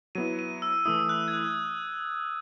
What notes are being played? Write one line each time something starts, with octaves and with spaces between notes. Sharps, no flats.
F#3 B3 E4 D#7
D#7
E6
E3 A3 E4 D#6
F#6
G#6
F#6